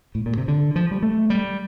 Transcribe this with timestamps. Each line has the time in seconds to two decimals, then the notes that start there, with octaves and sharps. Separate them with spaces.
0.15 A2
0.26 A#2
0.38 C3
0.48 D3
0.76 F3
0.91 G3
1.03 A3
1.30 G3